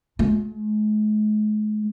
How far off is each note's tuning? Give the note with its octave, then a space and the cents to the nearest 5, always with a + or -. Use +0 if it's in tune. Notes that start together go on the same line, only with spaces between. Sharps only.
G#3 +45 F4 +35